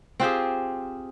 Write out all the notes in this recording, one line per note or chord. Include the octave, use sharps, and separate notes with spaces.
C4 F4 G4 G#4